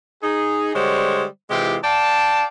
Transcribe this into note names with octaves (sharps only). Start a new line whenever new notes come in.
D#4 G#4
D3 G3 G#3 C5 C#5
C3 E3 G#3 E4 F4 G4
D5 F5 G5 A5